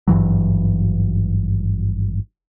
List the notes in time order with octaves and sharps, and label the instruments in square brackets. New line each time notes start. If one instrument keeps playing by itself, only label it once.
[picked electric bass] G#1 G2 E3 F#3